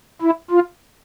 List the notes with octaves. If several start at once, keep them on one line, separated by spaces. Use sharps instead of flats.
E4
F4